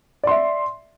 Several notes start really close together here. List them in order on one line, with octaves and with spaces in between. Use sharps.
D5 C6 E5